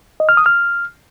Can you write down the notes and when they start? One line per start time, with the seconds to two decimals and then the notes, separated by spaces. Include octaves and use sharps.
0.20 D#5
0.29 F6
0.37 D#6
0.46 F6